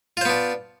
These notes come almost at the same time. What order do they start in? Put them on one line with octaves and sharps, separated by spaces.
F4 C5 B3 D4